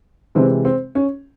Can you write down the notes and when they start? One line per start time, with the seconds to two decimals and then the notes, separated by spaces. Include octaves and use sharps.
0.35 C3 E3 G#3 C4
0.65 C4
0.95 C#4